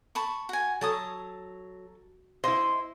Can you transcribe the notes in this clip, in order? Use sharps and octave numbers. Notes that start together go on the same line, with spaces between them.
A5 B5 C#6
F#4 G#5
F#3 A4 A5 D#6
E4 C5 D#5 E5